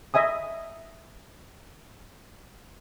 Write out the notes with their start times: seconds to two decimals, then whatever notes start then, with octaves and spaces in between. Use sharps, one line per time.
0.14 D#5 E5 G#5 D#6